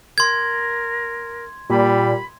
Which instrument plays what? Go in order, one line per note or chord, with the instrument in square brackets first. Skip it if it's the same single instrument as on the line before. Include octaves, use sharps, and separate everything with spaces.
[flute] A#4 [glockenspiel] C6 G#6
[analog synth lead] A#2 [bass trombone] G3 [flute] B5